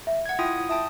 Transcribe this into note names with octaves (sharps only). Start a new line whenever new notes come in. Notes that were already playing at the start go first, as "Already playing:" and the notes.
E5
F#5 G#6
E4 F4 G5 D#6
E5 G5 A5 D#6